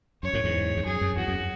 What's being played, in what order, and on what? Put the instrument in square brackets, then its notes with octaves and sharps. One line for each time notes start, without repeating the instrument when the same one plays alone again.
[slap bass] F#2 [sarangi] C#5
[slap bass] F#2 A2
E2 G#2
E2
[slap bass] F#2 [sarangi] G#4
[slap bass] F#2
[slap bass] E2 [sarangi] F#4
[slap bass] F#2